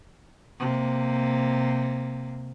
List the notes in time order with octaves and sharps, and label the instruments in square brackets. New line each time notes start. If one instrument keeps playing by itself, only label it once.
[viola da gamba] C3 A#3